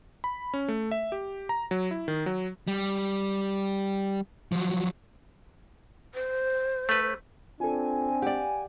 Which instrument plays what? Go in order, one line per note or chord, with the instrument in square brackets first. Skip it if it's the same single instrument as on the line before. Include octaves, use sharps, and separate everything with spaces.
[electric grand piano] B5
C#4
A3
E5
G4
A#5
F#3
E4
D#3
F#3
[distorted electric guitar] G3
F3 F#3
[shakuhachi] C5
[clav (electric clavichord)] A3 B4
[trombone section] C4 D4 [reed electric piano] F4 A4 [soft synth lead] G#5
[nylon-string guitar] G4 D5 [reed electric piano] F#5